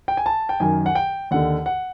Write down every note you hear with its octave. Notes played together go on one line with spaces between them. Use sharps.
G5
G#5
A5
G5
F#2 D#3 G#5
F#5
G5
D#2 D3 F#5
F#5